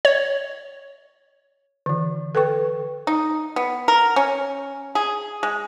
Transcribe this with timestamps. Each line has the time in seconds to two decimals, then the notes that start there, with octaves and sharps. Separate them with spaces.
0.05 C#5
1.86 D3 E3
2.35 A4 B4 G5 C#6
3.07 D#4
3.56 B3
3.88 A#4
4.16 C#4
4.95 G#4
5.43 G#3